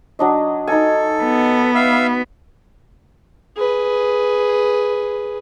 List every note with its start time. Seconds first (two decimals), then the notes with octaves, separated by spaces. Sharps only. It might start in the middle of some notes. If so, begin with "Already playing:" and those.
0.19 F#3 D4 D#5
0.67 D#4 A4 G#5
1.23 B3
1.75 E5 F5 E6
3.57 G#4 B4